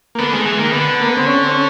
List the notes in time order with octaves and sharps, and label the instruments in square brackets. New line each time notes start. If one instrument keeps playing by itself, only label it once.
[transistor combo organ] A#3
[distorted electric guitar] D3 [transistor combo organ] B3
[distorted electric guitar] D#3 [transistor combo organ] G#3
[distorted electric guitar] E3 [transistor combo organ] G#3
[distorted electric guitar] D#3 [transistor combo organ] A#3
[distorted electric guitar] D3 [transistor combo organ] B3
[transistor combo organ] A#3
B3
C4
C#4
C4
C#4